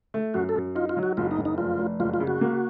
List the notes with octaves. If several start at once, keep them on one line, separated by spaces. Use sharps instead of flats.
A3
F#2 F#4
A4
F#2
D#4 F4
F4
F#3
F#4
F#1 F4
D#4
F#1
D#4
F1 F4
F1
F#1 F4
F4
C#3
F#4
A#3